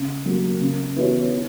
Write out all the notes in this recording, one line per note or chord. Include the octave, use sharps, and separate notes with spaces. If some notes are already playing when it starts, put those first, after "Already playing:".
Already playing: C#3
F#3 A#3
C#3
E3 B3 F#4 C#5
E3